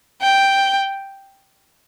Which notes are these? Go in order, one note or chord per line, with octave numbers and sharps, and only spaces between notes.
G5